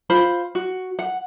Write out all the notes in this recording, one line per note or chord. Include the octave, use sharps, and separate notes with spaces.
F4 C5 B5
F#4
F#5